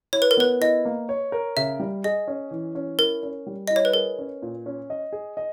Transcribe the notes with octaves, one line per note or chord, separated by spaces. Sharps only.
E4 C#5
B4
A#4
B3 B4
E4 D#5
A#3
C#5
A#4
C#3 E5
G3
G#4 D#5
C#4
E3
C#4
E4 A#4
C#4
G3
E4 D#5
C#5
B4
G#4 A#4
C#4
A#2
C#4
D#5
G#4
D#5